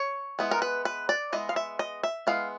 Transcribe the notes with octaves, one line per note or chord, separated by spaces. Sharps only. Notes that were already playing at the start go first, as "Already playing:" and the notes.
Already playing: C#5
G#3 B3 E4
A#4
B4
B4
D5
G#3 B3 E4 D#5
F5
E5
D#5
E5
G#3 B3 E4 F5